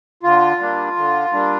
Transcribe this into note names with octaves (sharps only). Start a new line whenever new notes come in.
D3 F4
G3 A#3 D4
D3
G3 A#3 D4